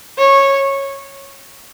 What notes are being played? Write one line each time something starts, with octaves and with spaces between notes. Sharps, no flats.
C#5